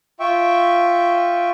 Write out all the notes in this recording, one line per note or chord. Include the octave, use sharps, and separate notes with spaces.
F4 E5 G5 C#6